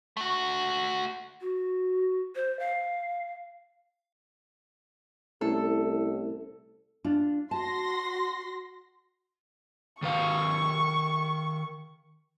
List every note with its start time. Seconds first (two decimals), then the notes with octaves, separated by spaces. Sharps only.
0.17 A3 F#4
1.41 F#4
2.35 C5
2.59 F5
5.41 C2 A3 C#4 E4 A4
7.04 D4 F4
7.51 F#4 A5 C6 A#6
10.02 D#3 B4 F5 C#6